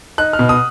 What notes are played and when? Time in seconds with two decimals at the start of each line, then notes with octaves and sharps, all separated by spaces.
0.18 D#4 F#6
0.33 F6
0.39 B2
0.49 D#6